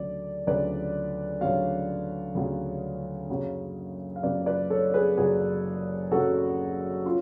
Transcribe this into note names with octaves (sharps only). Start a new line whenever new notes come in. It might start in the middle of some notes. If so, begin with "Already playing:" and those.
Already playing: D2 C#3 F#3 D5
D2 C#3 F#3 B4 D5
D2 C#3 F#3 C#5 F5
D2 C#3 F#3
F#1 F#2 C#3 F#3
F5
F#1 F#2 C#3 F#3 B4 D5
B4 D5
A4 C#5
G#4 B4
F#1 F#2 C#3 F#3 G#4 B4
F#1 F#2 C#3 F#3 F#4 A4
C#4 F4